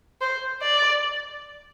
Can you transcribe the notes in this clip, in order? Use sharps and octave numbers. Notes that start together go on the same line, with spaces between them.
C5
D5